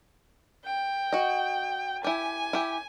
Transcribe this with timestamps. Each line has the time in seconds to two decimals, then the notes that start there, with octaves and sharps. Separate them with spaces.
0.65 G5
1.13 F#4 D#5
2.04 E4 G4 G#5
2.53 E4 G4